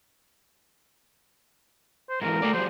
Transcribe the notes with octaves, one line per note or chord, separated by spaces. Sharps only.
C5
G#2 E3 A#4
A3 D5
F#3 G#3 C5